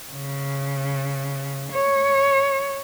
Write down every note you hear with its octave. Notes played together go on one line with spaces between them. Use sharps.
C#3
C#5